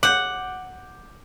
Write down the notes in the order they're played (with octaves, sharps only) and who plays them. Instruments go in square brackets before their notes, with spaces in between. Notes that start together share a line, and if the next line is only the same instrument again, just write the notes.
[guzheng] F#5 [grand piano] D6 G6